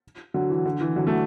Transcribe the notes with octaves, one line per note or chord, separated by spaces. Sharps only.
D3 F#3
E3
D3
E3
D3 F#3
F#3 A3